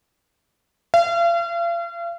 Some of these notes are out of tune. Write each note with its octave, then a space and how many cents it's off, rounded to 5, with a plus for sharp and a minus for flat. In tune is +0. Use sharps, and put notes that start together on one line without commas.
F5 -40